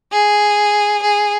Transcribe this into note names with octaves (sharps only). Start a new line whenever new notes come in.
G#4
G#4